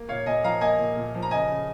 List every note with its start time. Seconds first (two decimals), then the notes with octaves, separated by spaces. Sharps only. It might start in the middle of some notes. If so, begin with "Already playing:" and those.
Already playing: A#3
0.09 A#2 C#5 F5
0.26 A#2 D#5 G#5
0.44 F3 F5 A#5
0.61 A#3 D#5 G#5
0.79 A#2
0.96 A#2
1.15 F3
1.22 A#5
1.31 C#3 D#5 G#5
1.49 C#3